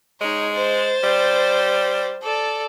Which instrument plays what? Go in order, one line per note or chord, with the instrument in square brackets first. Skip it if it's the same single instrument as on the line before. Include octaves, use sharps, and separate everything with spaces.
[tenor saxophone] G#3 [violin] D#4 C#5
[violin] C5 A6
[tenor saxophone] G3
[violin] A4 D5